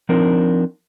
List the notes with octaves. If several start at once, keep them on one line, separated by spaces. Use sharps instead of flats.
F3 C4 D4 D#4 A#4